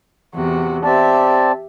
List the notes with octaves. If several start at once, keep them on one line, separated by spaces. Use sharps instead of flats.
E2 C3 F#4
C4 G4 D5 E5 A5